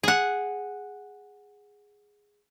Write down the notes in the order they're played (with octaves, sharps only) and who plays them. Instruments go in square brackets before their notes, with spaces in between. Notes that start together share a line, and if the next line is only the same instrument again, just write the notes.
[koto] G#4 F#5